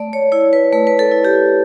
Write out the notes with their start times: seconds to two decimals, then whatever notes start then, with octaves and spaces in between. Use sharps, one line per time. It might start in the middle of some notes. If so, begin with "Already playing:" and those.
Already playing: A3 D5
0.13 C#5
0.32 E4 C#5
0.53 B4
0.73 A3 B4
0.87 B4
0.99 A4
1.12 E4
1.25 G4